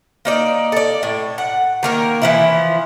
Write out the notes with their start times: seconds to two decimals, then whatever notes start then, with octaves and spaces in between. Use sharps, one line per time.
0.25 A#3 D#4 D5
0.72 A4 D5
1.03 A2
1.38 F#5
1.83 D#3 A#3 A#4
2.22 E3 F3 E4